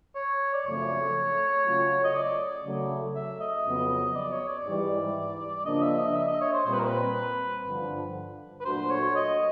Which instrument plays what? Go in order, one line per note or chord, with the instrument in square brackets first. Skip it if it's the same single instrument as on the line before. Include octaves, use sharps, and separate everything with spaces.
[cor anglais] C#5
D5
[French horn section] F#2 C#3 F3 A3 C4 [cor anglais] C#5
[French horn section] C#3 F#3 A3 C#4 F4
[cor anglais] D#5
D5
[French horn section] C#3 F#3 A3
[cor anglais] E5
D#5
[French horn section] F2 C#3 F#3 B3
[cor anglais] D5
C#5
D5
[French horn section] G#2 E3 G3
[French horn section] C#3 F3 A#3 D4 [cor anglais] D#5
[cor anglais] E5
D#5
E5
D#5
C#5
C5
[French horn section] A#2 G3 C4 [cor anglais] C5
[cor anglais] B4
A#4
B4
[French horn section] G2 D3 F3
[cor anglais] B4
[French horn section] A#2 F#3 A3 D4 F#4 [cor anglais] C5
[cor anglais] C#5
D#5